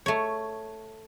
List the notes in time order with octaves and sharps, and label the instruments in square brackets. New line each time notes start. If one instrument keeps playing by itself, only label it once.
[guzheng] A3 C#5